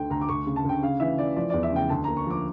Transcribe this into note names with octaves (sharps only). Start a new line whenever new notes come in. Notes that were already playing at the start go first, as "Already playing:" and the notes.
Already playing: D2 D3 A3 G5
D2 A#5
D6
D2 C#6
C#3
A5
D2 G5
C#3 F5
E3 E5
E3 D5
F3 D5
E2 D5
E5
C#3 G5
D2 A5
A#3 A#5
C#6
F3 D6